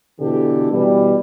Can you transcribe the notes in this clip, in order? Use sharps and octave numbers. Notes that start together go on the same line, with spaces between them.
B2 D3 E3 G4 A4
B2 E3 G3